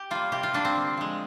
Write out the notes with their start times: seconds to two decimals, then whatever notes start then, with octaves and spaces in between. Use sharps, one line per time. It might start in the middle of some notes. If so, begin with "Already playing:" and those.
Already playing: G4
0.11 G3 A#3 F4
0.32 C3 G4
0.43 F4
0.53 G3 A#3 D4
0.65 C4
0.75 D3
0.97 F3 G#3